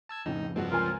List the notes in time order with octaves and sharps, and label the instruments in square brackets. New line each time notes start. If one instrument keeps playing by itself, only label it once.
[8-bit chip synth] A5 E6 G#6
[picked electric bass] F2 C#3 [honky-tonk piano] A2 [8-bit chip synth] D#4
[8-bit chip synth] G2 F3 C4 [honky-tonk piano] G#3 F#4
[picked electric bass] C#2 [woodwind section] F4 [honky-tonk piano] A#4 G#5